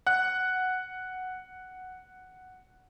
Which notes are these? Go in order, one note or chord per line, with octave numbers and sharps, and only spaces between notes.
F#5 F#6